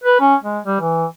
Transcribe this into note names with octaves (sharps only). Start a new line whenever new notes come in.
B4
C#4
G#3
G3
E3